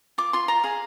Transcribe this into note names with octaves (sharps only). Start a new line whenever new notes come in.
F4 D6
F4 C6
F4 A#5
G#4 F5